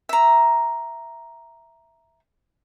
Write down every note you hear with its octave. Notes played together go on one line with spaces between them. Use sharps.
E5 A#5